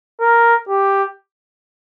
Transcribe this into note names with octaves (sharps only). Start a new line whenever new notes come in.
A#4
G4